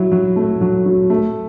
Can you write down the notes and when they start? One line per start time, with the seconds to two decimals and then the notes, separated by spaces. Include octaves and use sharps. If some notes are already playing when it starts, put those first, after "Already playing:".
Already playing: F#3 E4
0.12 F#3
0.36 A3
0.61 F#3
0.85 F#3
1.10 A3